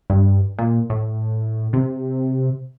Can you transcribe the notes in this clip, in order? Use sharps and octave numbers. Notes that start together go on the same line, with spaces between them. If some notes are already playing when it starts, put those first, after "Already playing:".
G2
A#2
A2
C3